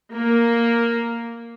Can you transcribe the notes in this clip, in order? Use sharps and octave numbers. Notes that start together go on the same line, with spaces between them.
A#3